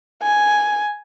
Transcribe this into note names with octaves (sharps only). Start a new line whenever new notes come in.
G#5